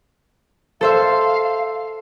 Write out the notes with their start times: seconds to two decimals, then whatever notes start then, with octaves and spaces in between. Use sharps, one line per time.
0.81 A4 C5 E5 F5